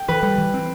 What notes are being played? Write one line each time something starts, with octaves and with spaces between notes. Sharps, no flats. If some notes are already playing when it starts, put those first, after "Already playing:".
Already playing: G5
E3 B4
G3
E3
C4